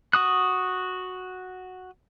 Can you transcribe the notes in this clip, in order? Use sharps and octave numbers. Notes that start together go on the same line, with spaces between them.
F#4 D#6 F#6